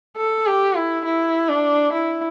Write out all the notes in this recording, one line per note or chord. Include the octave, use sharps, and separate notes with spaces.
A4
G4
E4
E4
D4
E4